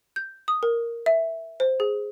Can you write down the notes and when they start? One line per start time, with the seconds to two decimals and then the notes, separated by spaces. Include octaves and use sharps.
0.16 G6
0.48 D#6
0.63 A#4
1.06 E5
1.60 C5
1.80 G#4